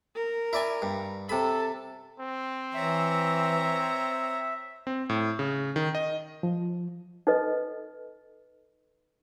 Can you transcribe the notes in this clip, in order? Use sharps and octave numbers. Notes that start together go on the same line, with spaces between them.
A#4
E4 D5 G#5
G2
C3 A4 B5
C4
E3 C#5 E5 A#5
C4
A2
C#3
D#3
D#5
F3
D#4 A4 B4 D#5